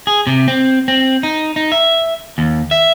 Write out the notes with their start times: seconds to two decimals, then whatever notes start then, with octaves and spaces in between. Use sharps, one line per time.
0.07 G#4
0.27 C3
0.48 C4
0.88 C4
1.23 D#4
1.56 D#4
1.72 E5
2.38 D#2
2.71 E5